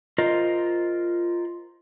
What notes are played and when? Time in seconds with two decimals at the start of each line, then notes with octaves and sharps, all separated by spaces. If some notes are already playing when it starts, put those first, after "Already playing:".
0.18 F4 A#4 C5 D#5